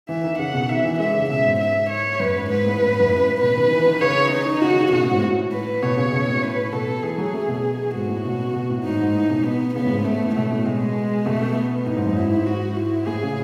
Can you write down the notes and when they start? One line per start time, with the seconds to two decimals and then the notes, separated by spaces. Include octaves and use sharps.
0.09 E3 E5
0.23 D#3
0.39 C#3 F#5
0.54 B2
0.69 D#3 E5
0.84 E3
0.99 G#3 E5
1.09 C#3
1.19 C#3
1.29 B2 E5
1.45 G#2
1.60 E5
1.90 C#5
2.20 F#2 B4
2.35 G#2
2.50 G#2 B4
2.66 A2
2.80 G#2
2.91 G#2
3.00 F#2
3.10 A2
3.41 B2 B4
3.56 D#3
3.71 E3
3.86 D#3
4.01 C#3 C#5
4.32 D#4
4.61 C#3 F#4
4.72 D#3
4.82 C#3
4.92 B2 F#4
5.03 A2
5.12 G#2
5.22 A2
5.52 B4
5.82 B2 C#5
5.97 C#3
6.12 B2
6.28 A2
6.43 B4
6.73 B2 A4
7.03 E3 G#4
7.18 F#3
7.34 A3
7.48 B2
7.94 G#2 F#4
8.09 A2
8.24 B2
8.54 B2
8.69 A2
8.84 G#2 D#4
9.00 G#2
9.15 A2
9.30 B2
9.44 B3
9.75 C#3 B3
9.85 A2
9.89 G#2
10.05 A3
10.25 A2
10.36 B2 A3
10.51 A2
10.65 B2 G#3
11.26 B2 A3
11.57 B3
11.86 A2 D#4
11.97 G#2
12.06 F#2
12.17 G#2 E4
12.31 G#2
12.47 F#4
12.77 E4
13.07 A2 G#4
13.22 C#3